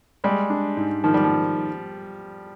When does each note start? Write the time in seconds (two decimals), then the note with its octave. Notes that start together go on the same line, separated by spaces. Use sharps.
0.24 G3 G#3
0.50 D4
0.77 G#2
1.04 D#3 F3
1.14 G3
1.24 F3